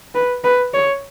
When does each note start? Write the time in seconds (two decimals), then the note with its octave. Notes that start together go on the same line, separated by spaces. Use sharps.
0.15 B4
0.44 B4
0.74 C#5